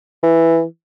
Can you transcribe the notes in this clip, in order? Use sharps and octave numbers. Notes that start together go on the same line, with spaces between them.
E3